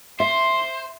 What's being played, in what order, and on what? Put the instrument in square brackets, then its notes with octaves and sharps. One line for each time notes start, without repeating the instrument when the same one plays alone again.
[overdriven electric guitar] C5 [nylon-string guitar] E5 [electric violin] C6